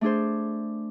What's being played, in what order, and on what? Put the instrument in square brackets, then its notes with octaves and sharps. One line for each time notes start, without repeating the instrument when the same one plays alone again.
[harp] A3 D4 G#4 C5